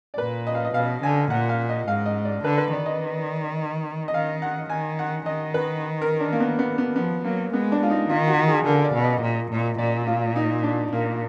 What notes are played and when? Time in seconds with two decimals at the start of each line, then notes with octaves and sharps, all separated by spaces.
0.14 D5
0.18 A#2 B4
0.47 D#5
0.55 F5
0.65 D#5
0.74 B2 F5
1.02 D3 G#5
1.30 A#2 F#5
1.49 F5
1.69 D#5
1.88 G#2 F5
2.06 D#5
2.25 D5
2.44 D3 B4
2.58 B4
2.72 D#3 D5
2.86 D#5
4.08 D#5
4.14 D#3 F5
4.42 F#5
4.70 D#3 G#5
4.99 F#5
5.26 D#3 D#5
5.54 B4
6.01 A#4
6.20 D4
6.32 A#3
6.40 B3
6.59 B3
6.78 B3
6.96 F3 B3
7.24 F#3 A#3
7.53 G#3 B3
7.72 D4
7.83 F4
7.90 D#4
8.09 D#3 F4
8.28 F#4
8.48 G#4
8.66 D3 A#4
8.84 D5
8.94 B2
9.04 D#5
9.22 A#2
9.51 A#2
9.78 A#2 D5
10.07 F4
10.36 D#4
10.63 D4
10.92 A#2 A#3